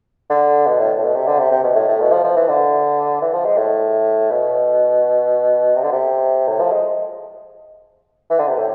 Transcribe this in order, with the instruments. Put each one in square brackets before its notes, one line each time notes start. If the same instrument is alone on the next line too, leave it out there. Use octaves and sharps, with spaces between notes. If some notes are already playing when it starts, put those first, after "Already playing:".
[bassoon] D3
B2
A2
A2
B2
C3
D3
C3
C3
B2
A2
A2
B2
F3
F3
E3
D3
E3
F3
G#3
A2
B2
C3
D3
C3
A2
F3
G#3
E3
D3
C3
A2